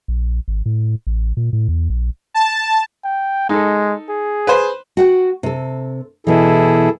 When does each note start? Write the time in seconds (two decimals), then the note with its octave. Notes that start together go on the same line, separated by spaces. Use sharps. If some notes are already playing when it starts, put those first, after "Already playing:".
0.08 A#1
0.48 G#1
0.66 A2
1.07 A1
1.37 A#2
1.53 A2
1.69 E2
1.90 A#1
2.34 A5
3.04 G5
3.49 G#3 D#4 A4
4.09 G#4
4.47 B4 C5
4.97 F#4 F#5 G5
5.43 C3 A4
6.27 B2 E3 E4 G#4 A4